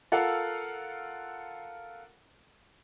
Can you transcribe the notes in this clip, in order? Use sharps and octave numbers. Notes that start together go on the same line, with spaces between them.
F4 A4 A#4 F5 F#5